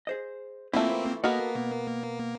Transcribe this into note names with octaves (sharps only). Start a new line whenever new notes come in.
G#4 C5 D#5
E3 A3 A#3 C4 E4 F4
A#3 B3 F#4 A4 A#4 D#5
B2